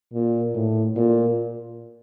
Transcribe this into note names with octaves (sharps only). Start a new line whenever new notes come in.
A#2
A2
A#2